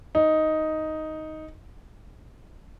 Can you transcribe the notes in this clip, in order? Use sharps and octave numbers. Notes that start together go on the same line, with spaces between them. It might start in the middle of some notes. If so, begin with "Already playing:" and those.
D#4